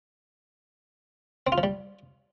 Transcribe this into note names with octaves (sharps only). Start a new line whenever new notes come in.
C4
F4
F3
G3